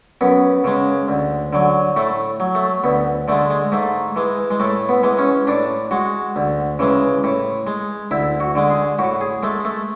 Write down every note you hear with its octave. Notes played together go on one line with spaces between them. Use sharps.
F#2 B3
C#3 G#3
D2
D3 F#3
A2 A3
F#3
A3
D2 B3
D3 G#3 A3
G#3
G#2 A3
E3 G#3
G#3
A2 A3
B3
E3 G#3
C#4
A2 D4
G#3 F#4
D2
C#3 E3 G#3
A2
G#3
D2 E4
F#4
D3 G#3
G#4
A2 F#4
G#4
G#3 A3
A3